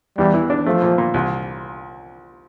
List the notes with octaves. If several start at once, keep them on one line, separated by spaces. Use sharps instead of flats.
E2 G3
E3
D4
F3 A3
A#2
A#2
C2